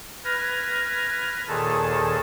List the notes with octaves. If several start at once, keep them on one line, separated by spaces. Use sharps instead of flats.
B4 F6 G#6 A#6
D#2 A#2 D#3 G#4 A4 A5